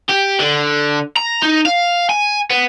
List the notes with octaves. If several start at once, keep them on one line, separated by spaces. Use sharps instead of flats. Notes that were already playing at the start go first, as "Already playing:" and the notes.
G4
D3
A#5
D#4
F5
G#5
B3